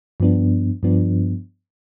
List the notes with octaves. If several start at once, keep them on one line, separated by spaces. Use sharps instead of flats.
G2 F3 B3 D4
G2 F3 B3 D4